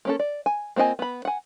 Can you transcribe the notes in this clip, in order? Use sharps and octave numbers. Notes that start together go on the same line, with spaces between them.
A#3 C#4 A4
D5
G#5
A#3 C4 F4 D#5 G#5
B3 B5
F#5 G#5